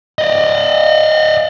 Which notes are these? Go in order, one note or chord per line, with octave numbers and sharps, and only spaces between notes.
D5 D#5